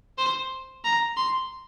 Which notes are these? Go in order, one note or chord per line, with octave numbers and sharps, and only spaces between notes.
C5
A#5
C6